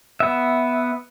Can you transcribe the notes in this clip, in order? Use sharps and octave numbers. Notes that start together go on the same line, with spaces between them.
B3 E5